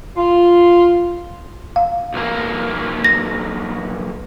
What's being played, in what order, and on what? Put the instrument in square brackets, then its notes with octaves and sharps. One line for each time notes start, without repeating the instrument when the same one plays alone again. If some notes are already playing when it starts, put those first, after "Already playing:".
[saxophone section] F4
[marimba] F5
[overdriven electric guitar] B1 A#3
[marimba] A#6